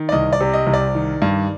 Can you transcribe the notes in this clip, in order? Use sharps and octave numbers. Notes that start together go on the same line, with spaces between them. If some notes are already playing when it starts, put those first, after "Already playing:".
Already playing: D#3
D5
C2 D#5
D5
C3
D#5
C2
D5
D#3
G2